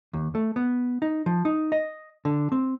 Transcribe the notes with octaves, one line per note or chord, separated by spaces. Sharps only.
D#2
A3
B3
D#4
F3
D#4
D#5
D3
C4